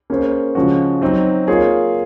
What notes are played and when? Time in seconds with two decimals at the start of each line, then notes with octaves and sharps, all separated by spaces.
0.10 A#3 C#4 G#4 C5
0.55 C#3 F3 G#3 C#4 F#4
1.01 F#3 C4 D#4
1.47 A#3 F4 G#4 C#5